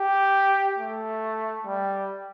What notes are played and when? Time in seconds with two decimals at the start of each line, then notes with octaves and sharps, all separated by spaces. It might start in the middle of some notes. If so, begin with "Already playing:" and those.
Already playing: G4
0.78 A3
1.66 G3